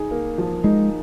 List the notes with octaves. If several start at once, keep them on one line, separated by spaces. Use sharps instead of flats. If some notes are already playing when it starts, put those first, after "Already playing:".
Already playing: D#4 G#4
A#3
F3
G#3 D#4